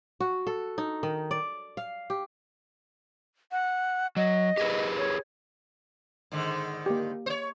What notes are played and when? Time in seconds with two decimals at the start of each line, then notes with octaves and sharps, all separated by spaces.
0.20 F#4
0.47 A4
0.78 D#4
1.03 D#3
1.31 D5
1.77 F5
2.10 G4
3.52 F#5
4.17 F#3 D#5
4.57 G4 G#4 B4
4.98 C#5
6.32 G#2 D3 D#3
6.86 A#3 G4
7.26 C5 C#5